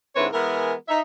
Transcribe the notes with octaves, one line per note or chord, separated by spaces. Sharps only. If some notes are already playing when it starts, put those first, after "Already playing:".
G#2 D3 C4 E4 B4 C#5
E3 G#3 B3 A#4
D#4 E5